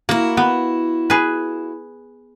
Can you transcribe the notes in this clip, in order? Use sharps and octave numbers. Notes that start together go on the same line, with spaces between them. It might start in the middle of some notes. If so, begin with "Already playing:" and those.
A#3 E4 F#4
B3
G#4 B4